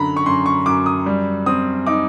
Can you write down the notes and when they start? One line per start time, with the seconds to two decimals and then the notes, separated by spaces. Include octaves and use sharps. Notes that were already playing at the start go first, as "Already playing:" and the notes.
Already playing: F#2 D3 A#5 B5
0.17 C#6
0.26 F#2 C6
0.46 C#6
0.66 F#2 D6
0.86 D#6
1.06 G3
1.46 C4 D#6
1.86 D#4 D6